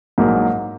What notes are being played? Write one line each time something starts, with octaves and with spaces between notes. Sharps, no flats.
A#1 G#2 F#3 A#3